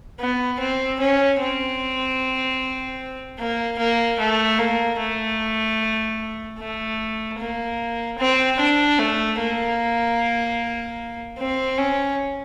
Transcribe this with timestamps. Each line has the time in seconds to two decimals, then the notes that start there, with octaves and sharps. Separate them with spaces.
0.20 B3
0.60 C4
1.00 C#4
1.40 C4
3.38 A#3
3.79 A#3
4.19 A3
4.58 A#3
4.99 A3
6.59 A3
7.38 A#3
8.18 C4
8.59 D4
8.98 A3
9.39 A#3
11.38 C4
11.78 C#4